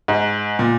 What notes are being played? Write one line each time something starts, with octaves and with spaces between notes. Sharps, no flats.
G#2
A#2